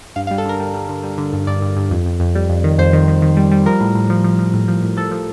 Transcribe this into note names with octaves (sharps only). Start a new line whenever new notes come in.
G2 F5
F5
G3
A4
D3 A#4
G3
G3
D3
G3
D3
G2
G2 D5
G2
G2
F2
F2
F2
G3
F2
D#3
F2 C5
D#3
D#3
D#3
G3
G3
F3 A#4
A2
A2
F3
F3
F3
A2
F3
A2
F3 A4
F3